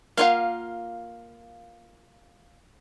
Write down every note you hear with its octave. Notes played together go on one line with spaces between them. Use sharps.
A#3 F4 F5 F#5